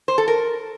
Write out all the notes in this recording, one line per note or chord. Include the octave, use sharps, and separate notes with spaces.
C5
A4
A#4